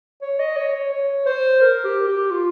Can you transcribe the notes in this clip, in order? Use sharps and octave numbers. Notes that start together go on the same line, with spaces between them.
C#5
D#5
C#5
C#5
C#5
C5
A#4
G4
G4
F4